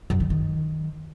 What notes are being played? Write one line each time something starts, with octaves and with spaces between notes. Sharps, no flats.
F#2
D#3
D#3